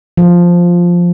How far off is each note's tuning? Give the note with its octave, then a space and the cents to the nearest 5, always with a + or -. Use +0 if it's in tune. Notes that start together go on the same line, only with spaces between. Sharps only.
F3 +0